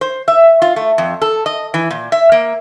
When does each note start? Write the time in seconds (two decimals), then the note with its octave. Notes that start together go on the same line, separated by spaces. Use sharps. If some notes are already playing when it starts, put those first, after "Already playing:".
0.01 C5
0.28 E5
0.62 F4
0.76 A3
0.98 F2
1.22 A4
1.46 D#5
1.74 E3
1.91 A#2
2.12 E5
2.32 A#3